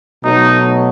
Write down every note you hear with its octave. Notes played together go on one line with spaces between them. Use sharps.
B2 F#3 A3 D#4